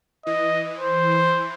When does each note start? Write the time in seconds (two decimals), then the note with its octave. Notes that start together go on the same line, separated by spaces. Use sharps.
0.26 E3 D#5
0.79 C5